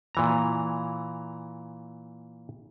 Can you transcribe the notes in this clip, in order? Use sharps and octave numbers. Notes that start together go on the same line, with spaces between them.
A#2 E3 A#5